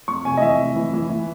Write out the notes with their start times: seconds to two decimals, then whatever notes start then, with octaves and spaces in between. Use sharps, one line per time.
0.08 F2 C#6
0.25 C3 G#5
0.37 D#5
0.42 E3 E5
0.59 C3
0.76 E3
0.94 E3
1.10 E3